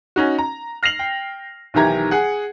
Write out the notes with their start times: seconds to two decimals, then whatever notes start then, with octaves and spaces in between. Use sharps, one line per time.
0.16 C#4 D#4 F#4
0.39 A#5
0.83 F6 A#6 C7 F7 F#7
0.99 G5
1.74 B1 D#3 E3 G4 A#5 G#6
2.11 G#4 F#5